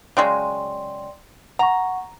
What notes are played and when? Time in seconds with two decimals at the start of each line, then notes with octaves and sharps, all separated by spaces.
0.17 C#3 F#3 G#3 D5 G5 C6
1.59 F#5 A#5 C#6